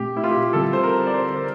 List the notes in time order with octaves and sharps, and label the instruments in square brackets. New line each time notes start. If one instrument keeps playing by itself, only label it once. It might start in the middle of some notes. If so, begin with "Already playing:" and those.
Already playing: [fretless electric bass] A#2 A3 C4 [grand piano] G4
[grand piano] E4
F4
G4
[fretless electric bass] D3 G3 C4 [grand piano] A4
[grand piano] C5
A#4
D5
C5
A#4